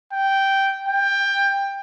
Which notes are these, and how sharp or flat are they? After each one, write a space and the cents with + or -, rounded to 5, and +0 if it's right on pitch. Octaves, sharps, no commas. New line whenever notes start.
G5 -10
G5 +20